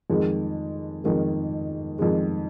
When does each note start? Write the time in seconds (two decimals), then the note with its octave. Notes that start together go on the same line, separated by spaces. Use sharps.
0.10 F2 D#3 G#3
1.04 F2 D#3 G#3
1.99 F2 D#3 G#3